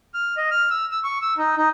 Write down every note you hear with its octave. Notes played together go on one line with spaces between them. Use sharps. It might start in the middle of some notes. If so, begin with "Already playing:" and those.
F6
D#5
F6
E6
E6
C#6
E6
D#4
D#4